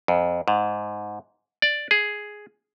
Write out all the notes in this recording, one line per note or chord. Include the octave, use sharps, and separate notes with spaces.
F2
G#2
D5
G#4